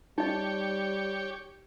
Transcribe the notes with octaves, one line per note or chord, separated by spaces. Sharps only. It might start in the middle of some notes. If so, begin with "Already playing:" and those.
G3 D#4 G4 C#5 D#5